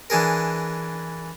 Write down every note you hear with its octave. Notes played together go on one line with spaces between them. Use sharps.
E3 D4 G#4 A#4